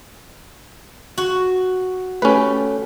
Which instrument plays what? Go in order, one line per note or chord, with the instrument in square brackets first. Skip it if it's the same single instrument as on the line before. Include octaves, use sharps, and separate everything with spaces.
[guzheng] F#4
[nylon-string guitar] A3 G4 [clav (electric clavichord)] C#4 B4